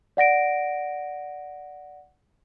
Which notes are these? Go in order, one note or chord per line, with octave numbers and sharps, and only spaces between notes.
D5 F#5 A#6 D7